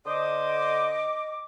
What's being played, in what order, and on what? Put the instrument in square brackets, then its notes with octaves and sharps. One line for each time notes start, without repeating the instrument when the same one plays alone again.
[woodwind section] D3 C5 D#6 [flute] D#5 [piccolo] D6